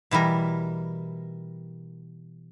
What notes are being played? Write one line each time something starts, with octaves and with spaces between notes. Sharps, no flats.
B2 E3 G3 A#4